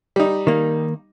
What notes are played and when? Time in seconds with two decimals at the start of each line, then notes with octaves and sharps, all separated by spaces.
0.16 G3 D#4
0.47 D#3 A#3